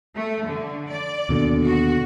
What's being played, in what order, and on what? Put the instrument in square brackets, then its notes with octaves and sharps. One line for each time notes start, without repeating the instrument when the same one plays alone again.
[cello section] A3
D3
D5
[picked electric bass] D#2 B2 D3
[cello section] F#4